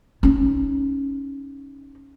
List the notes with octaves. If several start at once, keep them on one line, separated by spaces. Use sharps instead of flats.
C#4 D#4